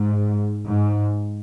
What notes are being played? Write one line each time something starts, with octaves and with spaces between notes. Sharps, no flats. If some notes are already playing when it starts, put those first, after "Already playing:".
Already playing: G#2
G#2